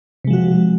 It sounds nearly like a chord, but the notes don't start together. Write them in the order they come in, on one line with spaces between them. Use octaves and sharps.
C3 G#3 F3 F#4